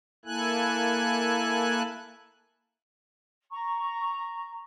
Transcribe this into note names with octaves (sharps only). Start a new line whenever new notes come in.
A#3 E4 A4 G#5 F#6
A#5 C#6